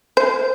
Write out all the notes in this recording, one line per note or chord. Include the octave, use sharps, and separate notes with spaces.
C5